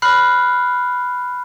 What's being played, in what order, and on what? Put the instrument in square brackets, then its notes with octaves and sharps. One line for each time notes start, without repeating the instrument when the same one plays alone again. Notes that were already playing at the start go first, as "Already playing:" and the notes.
[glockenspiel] B5 F6 F#6 C7